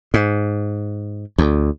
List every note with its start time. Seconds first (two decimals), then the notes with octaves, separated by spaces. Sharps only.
0.14 G#2
1.38 D2